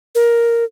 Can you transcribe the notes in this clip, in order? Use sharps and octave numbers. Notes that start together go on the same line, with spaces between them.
A#4